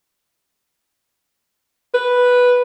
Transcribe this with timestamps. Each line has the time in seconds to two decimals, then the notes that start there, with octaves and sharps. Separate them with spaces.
1.94 B4